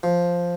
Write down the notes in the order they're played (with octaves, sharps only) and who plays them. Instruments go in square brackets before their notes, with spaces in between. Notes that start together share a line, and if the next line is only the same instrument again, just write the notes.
[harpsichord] F3